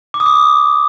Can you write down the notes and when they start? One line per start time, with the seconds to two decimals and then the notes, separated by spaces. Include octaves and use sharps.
0.14 D6
0.20 D#6
0.26 D6